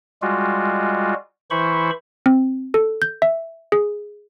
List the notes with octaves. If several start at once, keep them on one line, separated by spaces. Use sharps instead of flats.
G3 G#3 F4 F#4
E3 E4 C5 B5 C#6
C4
A4
G6
E5
G#4